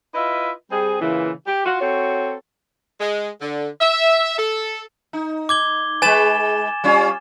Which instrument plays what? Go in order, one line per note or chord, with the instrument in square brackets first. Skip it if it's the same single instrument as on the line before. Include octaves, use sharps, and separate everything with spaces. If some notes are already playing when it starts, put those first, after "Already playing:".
[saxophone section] E4 F4 B4 D#5 E5
G3 C4 G#4
A#2 C#3 E3
G4
F4 F#4
C4 F#4 A4 C#5
[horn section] G#3
D3
E5
A4
[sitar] D#4
[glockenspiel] D6 G#6 G7
[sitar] G#3 B4 [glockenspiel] G#5 A6 E7
[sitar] G3 C#4 F4